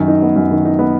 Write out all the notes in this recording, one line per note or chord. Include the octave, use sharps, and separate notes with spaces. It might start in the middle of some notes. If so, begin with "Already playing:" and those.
Already playing: F#2 D#3
D#4
B3
F#2
D#3
D#4
B3